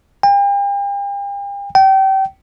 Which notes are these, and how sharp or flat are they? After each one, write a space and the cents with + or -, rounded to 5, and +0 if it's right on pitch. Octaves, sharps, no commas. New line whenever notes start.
G5 +40
G5 -30